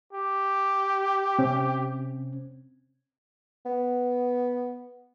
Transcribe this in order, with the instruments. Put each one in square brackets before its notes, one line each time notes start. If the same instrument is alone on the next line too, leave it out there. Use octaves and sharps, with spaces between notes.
[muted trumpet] G4
[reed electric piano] C3 C4 C#4
[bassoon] B3